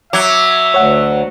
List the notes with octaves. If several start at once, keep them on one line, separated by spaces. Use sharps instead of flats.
F#3 E5 D6 G#6
D2 C#5 F#5